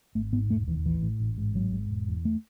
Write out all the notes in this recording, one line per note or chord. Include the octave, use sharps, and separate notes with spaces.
G#1 A3
G#2 B3
E1 A3
D#2 E3
A1 E3
A2
A1
G#2
G#1 F#3
G#2
E1
E2
A3